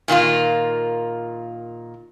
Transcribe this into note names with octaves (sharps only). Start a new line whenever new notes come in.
A#2 D#3 A#3 F4